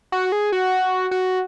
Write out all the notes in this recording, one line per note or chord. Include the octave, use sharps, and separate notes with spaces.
F#4
G#4
F#4
F#4